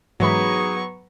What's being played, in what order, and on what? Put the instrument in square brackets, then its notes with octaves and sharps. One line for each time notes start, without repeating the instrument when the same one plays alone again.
[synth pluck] G#2 E3 B5 [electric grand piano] F#3 [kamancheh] B3 C#6 [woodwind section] D#4 G#4